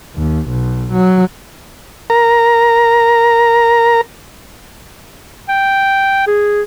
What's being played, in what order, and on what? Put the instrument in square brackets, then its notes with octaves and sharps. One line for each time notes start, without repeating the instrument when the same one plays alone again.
[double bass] D#2
B1
F#3
[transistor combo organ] A#4 A#5
[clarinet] G5
G#4